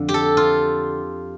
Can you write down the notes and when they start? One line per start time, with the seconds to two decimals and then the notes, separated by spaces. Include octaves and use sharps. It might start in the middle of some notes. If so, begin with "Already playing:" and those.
Already playing: F2 D3
0.09 G4
0.14 A4
0.37 F4